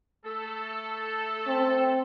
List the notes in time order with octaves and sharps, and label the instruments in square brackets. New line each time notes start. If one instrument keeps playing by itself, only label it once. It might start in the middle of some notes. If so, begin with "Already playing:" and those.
[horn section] A3 A4
[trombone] C4